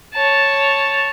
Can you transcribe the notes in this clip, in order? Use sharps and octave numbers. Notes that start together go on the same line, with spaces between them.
C#5 A5